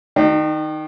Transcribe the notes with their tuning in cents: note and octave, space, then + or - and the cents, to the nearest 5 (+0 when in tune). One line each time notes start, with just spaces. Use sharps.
D#3 +0 D#4 -45